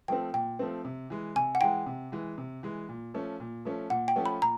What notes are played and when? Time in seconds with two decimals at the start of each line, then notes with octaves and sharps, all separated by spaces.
0.08 F3 A3 C4 G5
0.33 A#2 G5
0.59 F3 A3 C4
0.85 C3
1.10 E3 G#3
1.36 C3 G#5
1.55 F#5
1.61 E3 G#3 G5
1.86 C3
2.12 E3 G#3
2.38 C3
2.63 E3 G#3
2.89 A#2
3.14 F3 A3 C#4
3.40 A#2
3.65 F3 A3 C#4
3.90 A#2 F#5
4.08 G5
4.16 F3 A3 C#4
4.26 B5
4.42 A#2 A#5